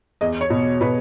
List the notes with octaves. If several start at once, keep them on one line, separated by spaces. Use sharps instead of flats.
E2 D#5
C#5
B2
B2 B4